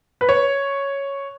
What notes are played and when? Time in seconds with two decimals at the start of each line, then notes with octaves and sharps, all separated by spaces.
0.21 B4
0.29 C#5